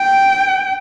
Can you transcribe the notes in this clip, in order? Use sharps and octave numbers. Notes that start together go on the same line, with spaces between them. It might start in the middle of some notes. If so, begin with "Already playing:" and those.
Already playing: G5